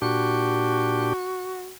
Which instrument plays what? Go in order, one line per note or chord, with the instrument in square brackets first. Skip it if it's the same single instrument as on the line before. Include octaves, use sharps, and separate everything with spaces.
[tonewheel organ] A#2 D4 G4 [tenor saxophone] F#4